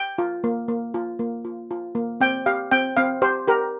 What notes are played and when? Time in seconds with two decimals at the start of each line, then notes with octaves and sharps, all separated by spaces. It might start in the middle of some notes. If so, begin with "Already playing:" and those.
Already playing: G5
0.18 F4
0.44 A#3
0.68 A#3
0.94 F4
1.19 A#3
1.45 F4
1.71 F4
1.95 A#3
2.21 C4 G5
2.46 G4 F5
2.71 C4 G5
2.97 C4 F5
3.22 G4 C5
3.48 G4 A#4